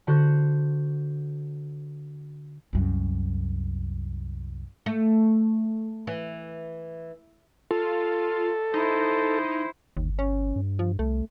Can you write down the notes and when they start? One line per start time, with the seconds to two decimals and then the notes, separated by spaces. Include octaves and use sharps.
0.07 D3 F#4 C5 F#6
2.73 C2 F#2
4.86 A3
6.07 E3
7.71 F4 A4
8.74 D#4 E4 C5
9.97 G1 D#2
10.19 C#4
10.56 G2
10.79 F3
10.99 C2 A3